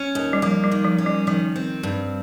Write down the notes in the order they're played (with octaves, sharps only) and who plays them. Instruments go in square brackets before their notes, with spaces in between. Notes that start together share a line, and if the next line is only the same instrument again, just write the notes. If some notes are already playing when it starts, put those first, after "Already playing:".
Already playing: [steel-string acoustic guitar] C#4
D#2
[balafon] G3
[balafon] F3 [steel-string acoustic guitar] A#3
[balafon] G3
[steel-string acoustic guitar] D#3
[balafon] F3
[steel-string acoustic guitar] C#4
[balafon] G3
[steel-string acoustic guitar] D#3 [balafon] F3
[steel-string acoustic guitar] C4
G2